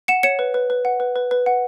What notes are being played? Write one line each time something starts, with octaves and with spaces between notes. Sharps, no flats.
F#5 C#7 E7
C#5 C#7 E7
B4
B4
B4
F#5
B4
B4
B4
F#5